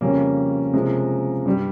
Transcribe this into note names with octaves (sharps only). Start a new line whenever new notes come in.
F2 C#3 G3 A#3 C#4
C3 F3 G#3
G2 G3